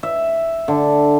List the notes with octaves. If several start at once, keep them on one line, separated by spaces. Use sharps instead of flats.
E5
D3